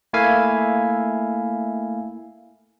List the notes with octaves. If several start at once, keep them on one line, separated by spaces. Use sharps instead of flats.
A3 A#3 E4 E5 F5 G#5